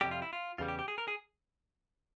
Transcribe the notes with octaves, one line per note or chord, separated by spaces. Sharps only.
F2 C3 G3 G4
F4
E4
F4
E2 C#3 G3 F4
G4
G4
G#4
A#4
G#4